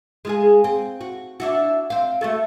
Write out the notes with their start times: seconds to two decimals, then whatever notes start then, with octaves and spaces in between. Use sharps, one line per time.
0.25 G#3 F4 G#4
0.64 C4
1.01 F#4
1.40 D4 E4 F#4
1.90 C4 F5
2.21 A3 F#4 A4